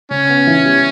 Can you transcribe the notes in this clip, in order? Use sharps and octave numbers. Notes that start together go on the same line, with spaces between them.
C#3 C#4
B3
E3
G3